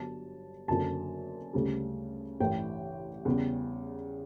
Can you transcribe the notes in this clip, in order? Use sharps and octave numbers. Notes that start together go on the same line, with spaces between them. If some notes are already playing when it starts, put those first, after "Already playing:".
Already playing: G1 G2 F#3 A5
F#1 F#2 D3 F#3 A5
D2 C#3 G3
A1 G2 E3 G5
E2 C#3 G3